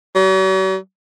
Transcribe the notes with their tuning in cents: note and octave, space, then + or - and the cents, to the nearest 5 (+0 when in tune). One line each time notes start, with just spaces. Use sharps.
F#3 +45